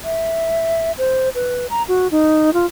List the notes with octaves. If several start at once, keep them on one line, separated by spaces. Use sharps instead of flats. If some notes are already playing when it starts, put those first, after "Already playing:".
E5
C5
B4
A#5
F#4
D#4
F4